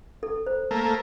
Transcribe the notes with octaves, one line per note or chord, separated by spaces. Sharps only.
A4
C5
A3 A#3